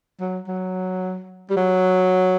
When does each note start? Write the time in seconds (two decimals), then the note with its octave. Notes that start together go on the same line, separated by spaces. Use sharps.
0.21 F#3
0.48 F#3
1.50 G3
1.57 F#3